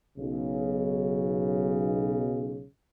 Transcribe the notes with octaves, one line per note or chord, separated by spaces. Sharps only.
B1 C#3